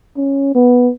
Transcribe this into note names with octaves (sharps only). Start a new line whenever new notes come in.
C#4
B3